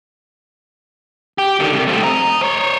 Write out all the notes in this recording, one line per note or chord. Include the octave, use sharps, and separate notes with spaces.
G4
D3 D#3
C3 G3
A3 C4
D#5 A#5
C5 C#5